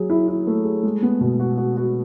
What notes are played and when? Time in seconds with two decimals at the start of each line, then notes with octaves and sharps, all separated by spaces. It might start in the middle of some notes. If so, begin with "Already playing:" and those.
Already playing: F#3 G#4
0.10 E4
0.28 E4
0.47 A3
0.65 G#4
0.83 G#3
1.02 B3
1.21 B2
1.40 F#4
1.57 F#4
1.77 F#4